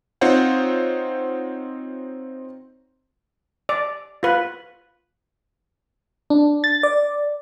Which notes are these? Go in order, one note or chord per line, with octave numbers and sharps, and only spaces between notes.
C4 D#4 F4 C5 C#5 F#5
D5
F4 B4
D4
A6
D5